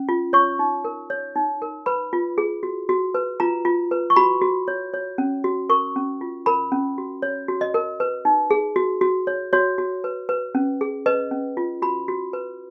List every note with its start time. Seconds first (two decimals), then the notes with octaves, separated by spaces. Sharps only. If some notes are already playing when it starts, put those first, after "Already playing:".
Already playing: C#4
0.09 F4
0.33 C#5 C#6
0.59 D#4
0.85 A#4
1.10 C#5
1.35 D#4
1.62 A#4
1.86 B4 B5
2.13 F4
2.38 G#4
2.63 F#4
2.89 F#4
3.14 B4
3.40 F4 A#5
3.65 F4
3.91 B4
4.10 C#6
4.16 F#4 B5
4.41 F#4
4.68 C#5
4.94 C#5
5.18 C#4
5.44 F#4
5.69 A#4 C#6
5.96 C#4
6.21 F4
6.46 A#4 B5
6.72 C#4
6.98 F#4
7.22 C#5
7.48 F#4
7.61 D#5
7.74 A#4
8.00 B4
8.25 D#4
8.51 G#4
8.76 F#4
9.01 F#4
9.27 C#5
9.53 F#4 C#5
9.78 F#4
10.04 B4
10.29 B4
10.55 C#4
10.81 G#4
11.06 B4 D#5
11.31 C#4
11.57 F4
11.82 F#4 B5
12.08 F#4
12.33 B4